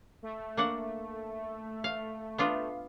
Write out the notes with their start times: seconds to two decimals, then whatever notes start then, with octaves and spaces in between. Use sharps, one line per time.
0.23 A3
0.57 A#3 D4 F#5
1.84 F5
2.38 B3 D4 F4